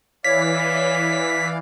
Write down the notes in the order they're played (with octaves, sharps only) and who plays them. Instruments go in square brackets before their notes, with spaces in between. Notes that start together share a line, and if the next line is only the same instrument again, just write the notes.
[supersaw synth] E3 [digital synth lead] C#5 [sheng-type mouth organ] D5 F5 [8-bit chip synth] B6